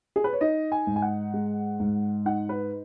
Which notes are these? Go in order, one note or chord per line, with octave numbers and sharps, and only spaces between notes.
G#4
B4
C#5
D#4 D#5
G#5
G#2
G#5
F#5
G#3
G#2
D#4 F#5
B4